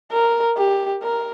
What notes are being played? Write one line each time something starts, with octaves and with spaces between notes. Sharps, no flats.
A#4
G4
A#4